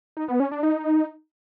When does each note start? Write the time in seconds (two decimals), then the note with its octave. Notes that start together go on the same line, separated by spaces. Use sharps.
0.17 D#4
0.28 B3
0.40 C#4
0.51 D4
0.63 D#4